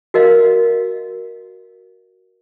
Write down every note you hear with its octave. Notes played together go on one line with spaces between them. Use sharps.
F#4 A#4 D#5 F5